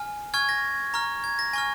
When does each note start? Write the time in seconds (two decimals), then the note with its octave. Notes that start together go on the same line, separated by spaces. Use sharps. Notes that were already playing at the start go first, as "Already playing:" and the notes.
Already playing: G#5 F6
0.34 G#5 C#6 F6 G#6
0.49 A#6
0.94 A#5 C#6 F6
1.24 G#6
1.39 A#6
1.53 G#5 C#6 F6 A#6